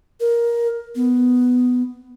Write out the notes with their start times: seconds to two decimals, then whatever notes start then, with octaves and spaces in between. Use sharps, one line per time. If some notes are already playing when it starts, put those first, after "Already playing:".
0.20 A#4
0.95 B3